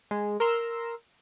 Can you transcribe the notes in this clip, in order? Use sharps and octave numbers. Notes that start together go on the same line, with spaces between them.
G#3
A#4 A#5 C6 E6